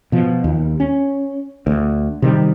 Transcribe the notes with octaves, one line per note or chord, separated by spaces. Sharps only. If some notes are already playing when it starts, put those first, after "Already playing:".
B2 F3
D#2
C#4
D2
C3 D#3 G3